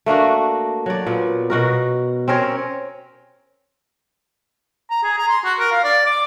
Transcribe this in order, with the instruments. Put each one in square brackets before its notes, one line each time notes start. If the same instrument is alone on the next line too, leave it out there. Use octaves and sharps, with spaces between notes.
[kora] A3 A#3 D4 F#4
F#3 D5
A#2 B3
B2 F#4 A#4
C4 C#4 A#4 C#5
[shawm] A#5
G#4
A#5
C6
F#4
A#4
F5
D5
D6